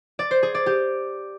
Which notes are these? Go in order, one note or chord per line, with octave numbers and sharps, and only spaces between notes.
D5
C5
G#4
D5
G4